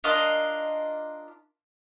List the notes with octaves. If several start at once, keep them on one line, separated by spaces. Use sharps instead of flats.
D4 F4 A#4 D#5